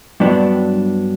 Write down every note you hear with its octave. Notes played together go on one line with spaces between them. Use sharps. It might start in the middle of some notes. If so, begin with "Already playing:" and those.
G2 F#3 B3 D4